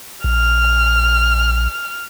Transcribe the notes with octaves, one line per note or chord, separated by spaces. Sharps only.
A#1 F6